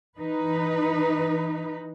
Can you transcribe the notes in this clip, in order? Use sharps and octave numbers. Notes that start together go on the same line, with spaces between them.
E3 D#4 B4